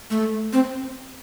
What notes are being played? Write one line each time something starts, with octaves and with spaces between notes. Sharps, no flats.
A3
C4